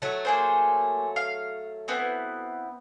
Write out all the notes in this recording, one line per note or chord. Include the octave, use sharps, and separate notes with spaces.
F#3 A3
A#3 G#4 C5
F5
B3 C4 E4